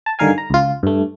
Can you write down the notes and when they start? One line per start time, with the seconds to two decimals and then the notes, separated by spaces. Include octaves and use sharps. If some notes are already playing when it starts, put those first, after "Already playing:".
0.06 A5
0.19 G2 D3 D#3 A#4 F5 G#5
0.38 A#5
0.50 C#2 F4
0.83 G2 A3